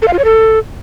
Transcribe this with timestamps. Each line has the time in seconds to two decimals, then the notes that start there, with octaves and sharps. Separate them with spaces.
0.02 A4
0.08 F5
0.13 F4
0.19 C#5
0.24 A4